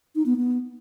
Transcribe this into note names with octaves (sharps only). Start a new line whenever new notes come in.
D#4
B3
B3